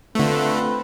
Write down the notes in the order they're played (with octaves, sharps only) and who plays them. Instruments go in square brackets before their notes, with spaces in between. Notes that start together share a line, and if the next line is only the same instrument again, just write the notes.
[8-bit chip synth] D3 A3 [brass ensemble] C4 F4 B4